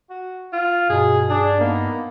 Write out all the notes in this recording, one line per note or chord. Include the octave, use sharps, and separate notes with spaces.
F#4
F4
G2 B2 G#4
D4 G#4
A#3 B3 D#4